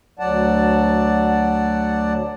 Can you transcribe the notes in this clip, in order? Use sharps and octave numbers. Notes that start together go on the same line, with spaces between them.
D2 F#3 D5 F#5 A5